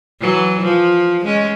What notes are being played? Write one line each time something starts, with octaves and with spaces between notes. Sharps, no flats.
E3 F#3
F3
G#3 C#4